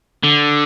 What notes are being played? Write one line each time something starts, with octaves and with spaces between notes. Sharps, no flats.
D3